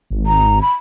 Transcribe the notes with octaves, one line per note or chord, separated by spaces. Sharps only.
G#1
A#5
B5